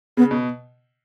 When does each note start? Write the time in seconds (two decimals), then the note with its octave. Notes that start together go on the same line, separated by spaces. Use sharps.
0.17 C#3 B3
0.31 B2